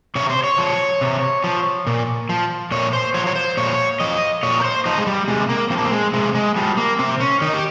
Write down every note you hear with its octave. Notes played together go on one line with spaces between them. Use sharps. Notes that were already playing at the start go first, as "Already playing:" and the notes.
C3 C#5
C5
C#5
F3
C3
F3
A#2
F3
A#2 C#5
C5
F3 C#5
C#5
C5
A#2 C#5
F3 D#5
A#2 C#5
A#4
C5
F3 D#4
G#3
G3
C3 G#3
A#3
F3 C4
A#3
C4
G#3
C3 G#3
G#3
F3 G3
A#3
C3 C4
C#4
D#3 D#4
G4